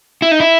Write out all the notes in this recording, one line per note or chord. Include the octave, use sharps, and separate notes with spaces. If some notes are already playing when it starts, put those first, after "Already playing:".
E4
D#4
E4